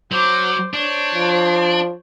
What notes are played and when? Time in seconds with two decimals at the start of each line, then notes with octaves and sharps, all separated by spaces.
0.12 F#3 C5 D6
0.74 D4 C5 C#5
1.15 F3